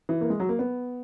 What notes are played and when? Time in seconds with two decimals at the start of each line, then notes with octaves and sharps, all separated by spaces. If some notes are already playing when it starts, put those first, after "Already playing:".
0.09 E3
0.21 A#3
0.30 G#3
0.40 F#3
0.49 A#3
0.59 B3